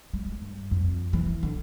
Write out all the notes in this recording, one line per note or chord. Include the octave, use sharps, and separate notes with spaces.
G#3
G2
F2
E3
D3